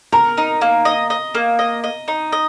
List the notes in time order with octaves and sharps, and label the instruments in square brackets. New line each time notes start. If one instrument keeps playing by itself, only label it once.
[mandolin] A#4 [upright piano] A#5
[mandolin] D#4
A#3
D#5
D#5
A#3
D#5
D#5
D#4
D#5